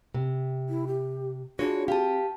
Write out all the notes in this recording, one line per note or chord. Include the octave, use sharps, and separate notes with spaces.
C3
E4
G4
D4 F4 F#4 G#4 C#5
C4 G4 F5 A5